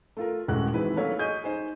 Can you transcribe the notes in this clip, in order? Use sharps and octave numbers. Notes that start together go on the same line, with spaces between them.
A3 F4 A#4
D#1 F#2 A2 G#3 F#4 F#6
D#3 E3 G#3 C4 E4 B4
F#3 A3 A#3 C#5 F5 B6
G#4 D#5 C#6 G6 D#7
D#4 C5 G#5